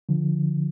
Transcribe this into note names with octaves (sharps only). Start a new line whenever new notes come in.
D3 F3